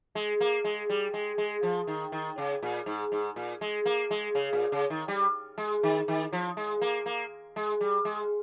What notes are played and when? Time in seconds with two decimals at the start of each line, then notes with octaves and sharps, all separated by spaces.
0.15 G#3
0.41 A#3
0.64 G#3
0.90 G3
1.14 G#3
1.38 G#3
1.63 F3
1.87 D#3
2.12 D#3
2.38 C#3
2.63 A#2
2.86 G#2
3.12 G#2
3.36 A#2
3.61 G#3
3.86 A#3
4.11 G#3
4.35 C#3
4.53 A#2
4.72 C#3
4.90 D#3
5.08 G3
5.58 G#3
5.83 D#3
6.08 D#3
6.33 F3
6.57 G#3
6.81 A#3
7.06 A#3
7.56 G#3
7.81 G3
8.05 G#3